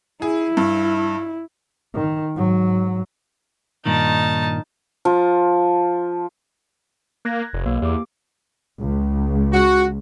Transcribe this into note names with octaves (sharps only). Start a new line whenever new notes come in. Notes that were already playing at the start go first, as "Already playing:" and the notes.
E4 G#4
G2
D#3
G#2 F#3
G2 A#2 D#3 D#4 A5
F3
A#3 F#6 G#6 A#6
F1
B1 A#3
E2 G4 D6
C#2
F#4